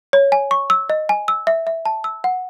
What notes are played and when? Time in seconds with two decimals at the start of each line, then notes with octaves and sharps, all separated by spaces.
0.13 C#5
0.32 G#5
0.51 C#6
0.70 E6
0.90 D#5
1.09 G#5
1.28 E6
1.47 E5
1.67 E5
1.85 A5
2.04 E6
2.24 F#5